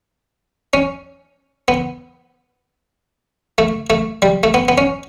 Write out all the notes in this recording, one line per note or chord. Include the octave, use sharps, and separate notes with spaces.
C#4
B3
A3
A3
G3
A3
B3
B3
C#4